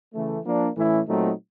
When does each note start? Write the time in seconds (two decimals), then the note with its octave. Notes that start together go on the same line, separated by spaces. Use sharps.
0.13 C#3 E3 A3
0.45 F3 A#3 D4
0.75 A2 E3 A3 C#4 E4
1.07 A#2 F#3 A3 C4 D#4